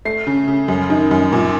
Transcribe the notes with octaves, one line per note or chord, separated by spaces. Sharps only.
A3 C7
C#3
C#3
F#2
D#3
F#2
A#2